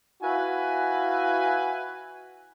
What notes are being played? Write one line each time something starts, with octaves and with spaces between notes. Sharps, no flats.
E4 F#4 B4 E5 F5 G#5